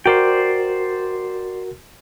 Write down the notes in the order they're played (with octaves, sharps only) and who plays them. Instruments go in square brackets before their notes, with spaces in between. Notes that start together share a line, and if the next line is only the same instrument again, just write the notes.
[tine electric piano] F#4 A#4 [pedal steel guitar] C5 D5 G5